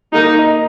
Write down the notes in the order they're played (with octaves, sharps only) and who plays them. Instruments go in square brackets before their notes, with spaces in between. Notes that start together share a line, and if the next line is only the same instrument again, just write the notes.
[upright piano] A#3 [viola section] D#4
[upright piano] D#4